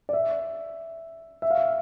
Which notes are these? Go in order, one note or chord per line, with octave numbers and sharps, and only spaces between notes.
D5
E5
E5
F5
E5